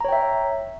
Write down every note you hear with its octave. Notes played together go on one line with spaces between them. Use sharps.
C#5 E5 G5 A#5